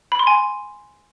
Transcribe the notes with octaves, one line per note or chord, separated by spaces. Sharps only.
B5
C6
G#5